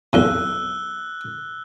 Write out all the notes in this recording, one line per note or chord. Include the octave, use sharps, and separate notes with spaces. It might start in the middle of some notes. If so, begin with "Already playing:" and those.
B1 E2 C3 E6 F#6 G7